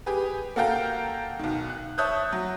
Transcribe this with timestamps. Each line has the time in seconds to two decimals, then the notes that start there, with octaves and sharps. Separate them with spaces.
0.06 G4 G#4 B4
0.56 A#3 F#4 A4 F5 G5 A#5
1.39 B1 D#3
1.69 F#6
1.98 C#5 E5 A5 D#6 F#6 G6
2.33 F#3